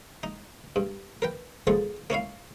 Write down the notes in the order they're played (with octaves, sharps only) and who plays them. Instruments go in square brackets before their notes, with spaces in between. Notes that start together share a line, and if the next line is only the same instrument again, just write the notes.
[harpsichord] D#4
G2
A#4 B4 G5
D3 F3 B3 F4 G#4 A4
A#3 C#4 E4 F5